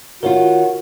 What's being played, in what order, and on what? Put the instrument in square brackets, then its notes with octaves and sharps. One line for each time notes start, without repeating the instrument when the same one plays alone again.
[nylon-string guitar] D#3 F4 [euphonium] F#4 [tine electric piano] A#4 C#5